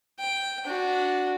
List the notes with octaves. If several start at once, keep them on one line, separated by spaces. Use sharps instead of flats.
G5
D4 F#4